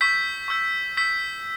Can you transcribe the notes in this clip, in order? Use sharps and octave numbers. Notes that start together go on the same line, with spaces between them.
C#6 E6 G6 B6
C#6 E6 G6
C#6 E6 G6 B6